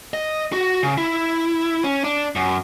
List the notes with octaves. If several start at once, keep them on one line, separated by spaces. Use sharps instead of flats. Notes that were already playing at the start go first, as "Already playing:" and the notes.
D#5
F#4
C#3
E4
C#4
D4
F#2